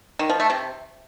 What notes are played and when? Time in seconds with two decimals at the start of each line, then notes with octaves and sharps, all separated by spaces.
0.19 D#3
0.30 F3
0.40 A3
0.50 C3